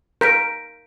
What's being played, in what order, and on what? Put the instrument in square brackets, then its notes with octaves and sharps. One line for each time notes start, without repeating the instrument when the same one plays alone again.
[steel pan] A#4 [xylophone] G6 B6 D7